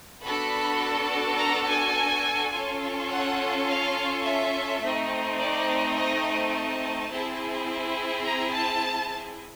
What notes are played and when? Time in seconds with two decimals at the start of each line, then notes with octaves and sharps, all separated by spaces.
0.24 B3 D4 F#4 A4 B5
1.38 A#5
1.67 G#5
2.52 C#4 F4 A4
3.09 F#5
3.67 F5
4.24 E5
4.81 A3 C4 D#4
5.38 D5
5.95 D#5
6.52 A5
7.09 C4 E4 G#4
8.24 A#5
8.52 A5